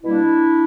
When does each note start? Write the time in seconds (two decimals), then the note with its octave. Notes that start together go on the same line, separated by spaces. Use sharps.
0.03 B2 G3 A#3 D4 E4